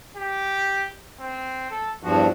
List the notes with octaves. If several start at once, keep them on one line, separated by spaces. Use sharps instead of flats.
G4
C4
A4
E2 G2 F3 F#4